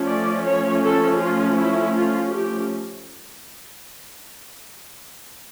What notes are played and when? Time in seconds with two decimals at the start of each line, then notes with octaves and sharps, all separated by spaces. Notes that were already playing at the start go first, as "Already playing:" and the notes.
Already playing: F3 A3 C#4
0.09 D5
0.46 C#5
0.84 A4
1.21 F4
1.57 E4
1.95 F4
2.31 G4